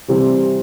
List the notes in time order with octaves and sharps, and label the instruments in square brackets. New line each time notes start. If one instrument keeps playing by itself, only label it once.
[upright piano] C3 E3 G3 C4